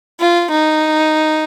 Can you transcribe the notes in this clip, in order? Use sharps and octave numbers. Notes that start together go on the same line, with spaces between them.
F4
D#4